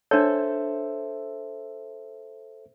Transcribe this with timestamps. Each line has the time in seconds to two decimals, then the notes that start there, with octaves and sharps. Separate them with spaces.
0.11 D4 A4 C5 C#5 E5